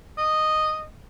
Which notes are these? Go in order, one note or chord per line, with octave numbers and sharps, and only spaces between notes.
D#5